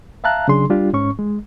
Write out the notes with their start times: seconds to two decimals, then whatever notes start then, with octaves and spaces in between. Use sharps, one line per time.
0.24 E5 F5 A5 A#5 F#6
0.48 C#3 F#3 D4 G#4 C6
0.70 G3 D4 F4 G4
0.93 G#2 C#4 C#6
1.19 G#3